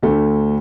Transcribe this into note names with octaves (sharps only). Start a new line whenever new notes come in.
D2 D3 A3